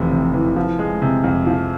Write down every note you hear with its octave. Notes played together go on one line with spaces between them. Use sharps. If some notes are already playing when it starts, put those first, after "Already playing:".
Already playing: F1 E2 C3 E3
C3
E3
F3
G#3
C3
F2
F3